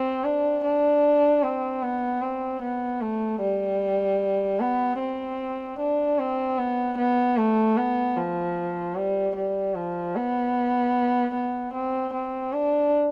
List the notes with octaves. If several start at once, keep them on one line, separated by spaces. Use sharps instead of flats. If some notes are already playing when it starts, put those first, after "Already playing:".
Already playing: C4
D4
D4
C4
B3
C4
B3
A3
G3
B3
C4
D4
C4
B3
B3
A3
B3
F3
G3
G3
F3
B3
B3
C4
C4
D4